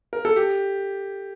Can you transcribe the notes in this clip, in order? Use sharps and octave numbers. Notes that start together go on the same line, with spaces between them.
A#4
A4
G4